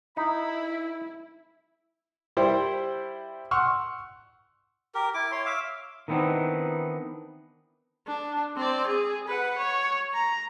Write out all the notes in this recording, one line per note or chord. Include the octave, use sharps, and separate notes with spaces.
D#4 E4 B5
G3 E4 G4 C5
F#5 C6 C#6 E6 F6
G4 A#4
E4 D6
C#5 C6
E5 F5 D6
D#3 E3 B3 C4 D4 D#4
D4
C4 D5
G#4
B4 F#5
C#5
A#5